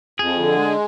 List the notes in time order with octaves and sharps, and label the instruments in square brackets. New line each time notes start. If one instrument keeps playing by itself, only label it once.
[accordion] F2 [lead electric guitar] G#4
[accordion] D3
G#3